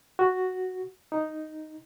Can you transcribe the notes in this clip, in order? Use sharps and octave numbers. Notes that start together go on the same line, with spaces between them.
F#4
D#4